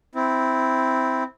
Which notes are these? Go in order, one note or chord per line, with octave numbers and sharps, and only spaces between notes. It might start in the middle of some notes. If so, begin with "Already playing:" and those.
C4 E4